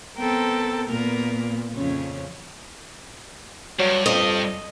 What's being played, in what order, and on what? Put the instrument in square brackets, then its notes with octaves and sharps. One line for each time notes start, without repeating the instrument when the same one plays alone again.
[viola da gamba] B3 C4 A4 [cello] A#4 G5
[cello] A#2 [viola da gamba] A#3 B3 A#4
[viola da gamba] F2 C#3 C#4
[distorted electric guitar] G2 [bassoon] F#3
[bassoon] F2 [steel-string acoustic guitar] D#5